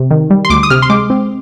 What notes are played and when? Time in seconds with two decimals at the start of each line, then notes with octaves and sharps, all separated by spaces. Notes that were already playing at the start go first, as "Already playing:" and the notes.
Already playing: C3
0.11 D#3
0.30 G3
0.45 C6
0.50 D2 D6
0.63 D#6
0.70 C3 F6
0.82 C6
0.90 G#3 D6
1.10 C4